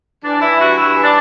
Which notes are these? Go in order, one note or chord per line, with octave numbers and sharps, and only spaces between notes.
E3 D4
E3 E4
G2 F#4
G2 E4
E3
D4